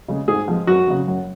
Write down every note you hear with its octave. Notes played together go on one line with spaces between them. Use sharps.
C#3 G#3
G#2 G#4
F3 G#3
F#2 F#4
C#3 F#3
F#2